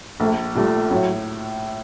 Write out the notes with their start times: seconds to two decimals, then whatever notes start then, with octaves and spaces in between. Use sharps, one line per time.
0.20 A#1 A3
0.55 A#2 G3 A3
0.90 A2 F#3